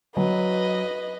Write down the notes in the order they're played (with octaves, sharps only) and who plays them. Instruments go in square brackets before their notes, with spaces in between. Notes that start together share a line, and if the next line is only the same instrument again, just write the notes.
[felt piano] F#3 [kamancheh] B4 D#5